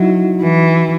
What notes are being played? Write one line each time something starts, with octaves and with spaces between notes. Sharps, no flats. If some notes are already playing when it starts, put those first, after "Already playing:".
Already playing: F#3 D#4 E4 F#4
E3